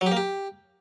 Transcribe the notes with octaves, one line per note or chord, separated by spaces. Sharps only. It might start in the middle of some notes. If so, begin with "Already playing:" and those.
F#3
G4
A#3
G4